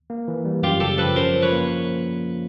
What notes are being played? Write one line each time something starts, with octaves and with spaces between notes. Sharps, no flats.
A#3
E3
G3
F#2 F4 G4
C#3 G4 A4
F3 A4 B4
C#4 A#4 C5
F3
B4 C#5
A#3